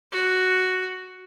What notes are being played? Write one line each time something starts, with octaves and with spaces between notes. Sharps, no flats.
F#4